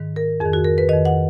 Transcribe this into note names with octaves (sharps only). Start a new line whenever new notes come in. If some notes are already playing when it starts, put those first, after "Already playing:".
Already playing: G#2 D#3
A#4
F2 G#4
D#3
F#4
A#4
B4
F2 D#3 D#5
F#5